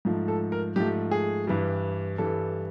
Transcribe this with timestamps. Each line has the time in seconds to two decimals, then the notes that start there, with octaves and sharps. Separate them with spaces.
0.05 G#2 F3 A3
0.28 A4
0.52 A#4
0.76 G#2 F3 A3 G4
1.11 G#4
1.47 G2 E3 G3
2.18 G2 E3 G3 A4